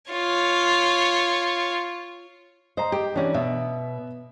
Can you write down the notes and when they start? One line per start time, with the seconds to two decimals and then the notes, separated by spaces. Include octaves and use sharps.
0.11 F4 C#5
2.77 C5 D#5 A#5
2.92 G4
3.15 E3 C#4 D4 C#5 D5
3.34 B2 B3 E5